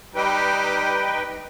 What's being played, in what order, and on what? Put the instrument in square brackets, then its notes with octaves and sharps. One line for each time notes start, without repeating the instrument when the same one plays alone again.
[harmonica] G3 B5 [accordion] D#4 B4 G5